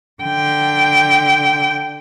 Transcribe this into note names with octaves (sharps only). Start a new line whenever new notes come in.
D3 G5